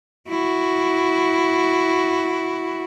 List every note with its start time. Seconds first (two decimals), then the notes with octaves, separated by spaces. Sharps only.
0.29 E4 F#4